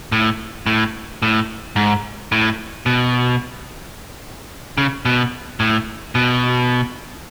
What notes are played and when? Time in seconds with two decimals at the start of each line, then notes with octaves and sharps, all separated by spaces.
0.12 A2
0.66 A2
1.22 A2
1.76 G#2
2.32 A2
2.86 B2
4.78 C#3
5.05 B2
5.60 A2
6.15 B2